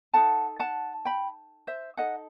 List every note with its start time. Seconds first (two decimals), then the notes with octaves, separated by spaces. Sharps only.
0.13 D#4 A4 F#5 A5
0.59 F#5 A5
1.05 G5 B5
1.67 C5 E5
1.97 D#4 A4 D#5 F#5